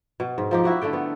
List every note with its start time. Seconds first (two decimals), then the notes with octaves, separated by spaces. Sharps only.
0.20 B2
0.38 G#2
0.51 F3 D#4 G4
0.64 E4 F#4 G4
0.81 D3 A3 A4 G5
0.93 B3